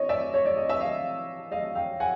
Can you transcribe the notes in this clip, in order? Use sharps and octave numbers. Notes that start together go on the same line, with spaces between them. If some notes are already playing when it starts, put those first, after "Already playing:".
Already playing: E3 C#5 D#5
D5 E5
C#5
D5
D#5
E5
D#5 F5
D#5 F5
F5 G5
F#5 G#5